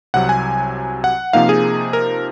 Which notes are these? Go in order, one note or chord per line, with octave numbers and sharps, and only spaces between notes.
C2 C3 F#3 F#5
G#5
F#5
C3 F3 A#3 D#4 F5
G#4
A#4